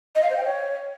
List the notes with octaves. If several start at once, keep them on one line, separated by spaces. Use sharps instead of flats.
D#5
F5
C5
G5
C#5